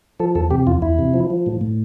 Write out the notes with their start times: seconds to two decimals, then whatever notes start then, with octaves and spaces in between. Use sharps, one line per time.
0.20 F3 A4
0.35 E2 A4
0.51 C3 G4
0.67 E2 F4
0.82 E2 E4
0.99 C3
1.14 F3
1.30 F3
1.46 A2
1.61 A2